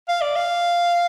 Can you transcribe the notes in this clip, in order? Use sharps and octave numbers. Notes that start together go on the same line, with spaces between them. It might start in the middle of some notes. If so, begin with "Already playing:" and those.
F5
D5
F5